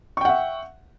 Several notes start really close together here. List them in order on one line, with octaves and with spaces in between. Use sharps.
C#6 G5 F#5 E5